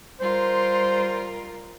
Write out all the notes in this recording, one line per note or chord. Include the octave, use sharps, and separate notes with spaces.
G3 F4 A#4 C5